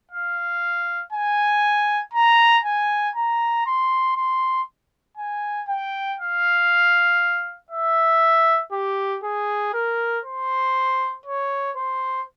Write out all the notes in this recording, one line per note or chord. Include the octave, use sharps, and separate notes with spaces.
F5
G#5
A#5
G#5
A#5
C6
C6
G#5
G5
F5
E5
G4
G#4
A#4
C5
C#5
C5